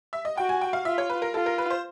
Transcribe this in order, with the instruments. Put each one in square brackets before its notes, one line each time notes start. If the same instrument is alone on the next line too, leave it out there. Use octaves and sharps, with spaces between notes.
[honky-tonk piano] E5
D#5
[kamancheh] F#4 [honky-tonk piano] G5
[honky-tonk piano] G#5
G5
F5
[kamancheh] F4 [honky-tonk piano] E5
[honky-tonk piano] C#5
B4
A#4
[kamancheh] F4 [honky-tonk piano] A4
[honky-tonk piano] A#4
B4
C5